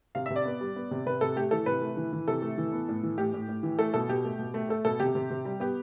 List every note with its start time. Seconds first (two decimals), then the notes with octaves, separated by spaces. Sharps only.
0.15 C3 F5
0.26 C3 E5
0.36 D5
0.45 B3
0.61 G3
0.76 B3
0.91 C3
1.06 C3 B4
1.21 C3 A4
1.36 A3 G4
1.51 E3 A4
1.66 C3 B4
1.81 A3
1.97 E3
2.13 E3
2.28 C3 A4
2.42 A3
2.58 E3
2.72 B3
2.89 A2
3.03 E3
3.18 A2 G4
3.34 A2
3.49 A2
3.63 E3
3.79 A3 A4
3.94 B2 A4
4.09 B2 G4
4.24 A3
4.39 B2
4.54 A3
4.69 A3 A4
4.85 B2 A4
5.00 C3 G4
5.15 C3
5.30 C3
5.45 G3
5.60 B3 G4